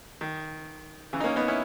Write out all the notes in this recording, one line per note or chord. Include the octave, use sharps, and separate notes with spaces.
D#3
C#3 E3
D#4
A#3 C#4
B3 D#4
C#4 E4